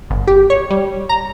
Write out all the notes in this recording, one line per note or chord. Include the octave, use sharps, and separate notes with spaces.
G1
G4
C#5
G3
A#5